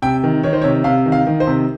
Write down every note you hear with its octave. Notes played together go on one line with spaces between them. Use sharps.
C3 G5
D#3
D#3 C#5
C5
C3 C#5
C3 F5
D#3
F5
D#3
C5
C3